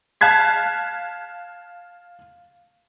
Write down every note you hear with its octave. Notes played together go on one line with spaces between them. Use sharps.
F5 A5 F#6 G#6 B6